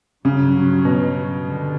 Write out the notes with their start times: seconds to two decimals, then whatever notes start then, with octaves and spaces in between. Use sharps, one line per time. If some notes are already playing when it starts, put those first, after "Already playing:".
0.25 G2 C#3 F#3 C#4
0.85 B2
1.44 D3 G3